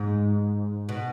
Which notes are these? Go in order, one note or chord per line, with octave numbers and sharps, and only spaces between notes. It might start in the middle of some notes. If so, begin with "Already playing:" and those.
Already playing: G#2
B2